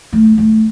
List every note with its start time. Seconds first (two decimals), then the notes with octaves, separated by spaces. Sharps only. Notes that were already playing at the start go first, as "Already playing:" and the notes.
0.13 A3
0.38 A3